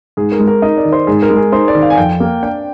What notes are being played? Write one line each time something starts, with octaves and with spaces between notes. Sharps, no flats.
G#2 G#4
A#4
G#3
A#4
D#4 D#5
D5
D#3
C5
G#2 G#4
A#4
G#3
G#4
D#4 C5
D5
D#3
F5
G#5
F2 G5
A#3
D4 G5